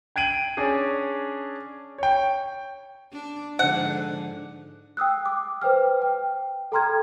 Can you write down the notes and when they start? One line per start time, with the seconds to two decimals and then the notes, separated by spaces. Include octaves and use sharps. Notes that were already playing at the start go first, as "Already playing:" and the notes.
0.16 G5 G#6 D7 D#7 F#7
0.57 C#4 D4 G#4
1.98 C#5 G5
3.12 D4
3.59 G#2 D3 F3 F#5
4.97 G5 D#6 E6 F#6
5.26 D6
5.62 B4 C5 G5 F6
6.02 G5
6.72 A4 G5 A#5 C6 F6 G#6